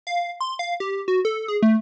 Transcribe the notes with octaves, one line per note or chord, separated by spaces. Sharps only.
F5
C6
F5
G4
F#4
A4
G#4
A3